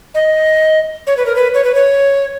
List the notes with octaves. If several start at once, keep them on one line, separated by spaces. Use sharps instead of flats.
D#5
C#5
B4
A#4
B4
C#5
B4
C#5